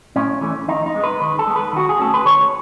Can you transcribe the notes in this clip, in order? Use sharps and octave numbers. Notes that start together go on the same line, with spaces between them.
A2 C#4
E3 A3 C#4
D#3 D#4
D#4
G#3 B3
B4
D#3 B4
A4
G#3 B3
B4
D#3 F#4
G#4
A3 C#4 A4
B4
D#3 C#5